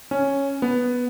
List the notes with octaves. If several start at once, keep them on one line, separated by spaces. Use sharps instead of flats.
C#4
B3